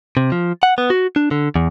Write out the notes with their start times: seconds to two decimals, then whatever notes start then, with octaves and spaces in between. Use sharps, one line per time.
0.17 C3
0.32 F3
0.63 F#5
0.78 B3
0.90 F#4
1.16 D4
1.31 D3
1.56 E2